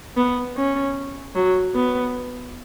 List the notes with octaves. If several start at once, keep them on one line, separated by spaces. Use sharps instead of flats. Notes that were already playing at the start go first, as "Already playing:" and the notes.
B3
C#4
F#3
B3